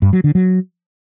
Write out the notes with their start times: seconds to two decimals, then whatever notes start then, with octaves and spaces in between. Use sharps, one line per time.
0.02 G2
0.13 F#3
0.24 D3
0.35 F#3